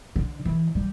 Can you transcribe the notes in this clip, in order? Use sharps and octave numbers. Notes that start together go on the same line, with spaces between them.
D3
E3
G3